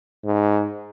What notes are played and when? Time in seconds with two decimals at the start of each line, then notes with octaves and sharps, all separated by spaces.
0.24 G#2